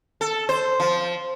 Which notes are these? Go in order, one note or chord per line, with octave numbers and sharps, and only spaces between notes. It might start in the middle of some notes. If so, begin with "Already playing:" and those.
A4
C5
F3